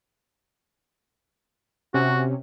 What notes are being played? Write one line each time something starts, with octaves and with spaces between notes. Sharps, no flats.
C3 C#4 F#4